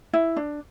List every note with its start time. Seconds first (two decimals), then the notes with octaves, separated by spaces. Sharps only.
0.13 E4
0.37 D4